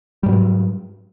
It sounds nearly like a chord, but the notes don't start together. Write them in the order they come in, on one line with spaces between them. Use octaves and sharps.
G3 G#2 F#3